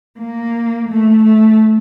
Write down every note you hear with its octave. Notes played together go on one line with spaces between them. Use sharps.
A#3
A3
A3